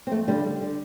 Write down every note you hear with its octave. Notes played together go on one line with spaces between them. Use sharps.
C4
F2 A3
D3 G3
D3
D3